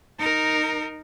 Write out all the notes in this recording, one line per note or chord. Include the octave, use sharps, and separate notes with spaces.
D#4 A#4